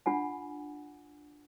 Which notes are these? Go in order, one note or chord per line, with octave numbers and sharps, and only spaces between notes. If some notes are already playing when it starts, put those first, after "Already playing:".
D4 F4 F#5 G#5